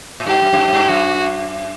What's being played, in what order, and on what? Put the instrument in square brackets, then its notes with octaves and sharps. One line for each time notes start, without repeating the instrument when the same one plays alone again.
[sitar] A2
[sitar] G2 [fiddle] G4
[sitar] F#2
F#2
G2
F#2
G2
[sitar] F#2 [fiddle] F#4